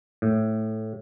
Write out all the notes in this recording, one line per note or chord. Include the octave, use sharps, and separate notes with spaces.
A2